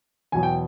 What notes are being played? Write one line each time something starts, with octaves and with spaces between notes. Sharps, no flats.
E2 B2 F#3 G#5
G5